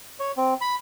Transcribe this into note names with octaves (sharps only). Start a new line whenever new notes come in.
C#5
C4
B5